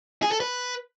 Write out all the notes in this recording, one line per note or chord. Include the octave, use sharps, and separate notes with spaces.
G#4
A4
B4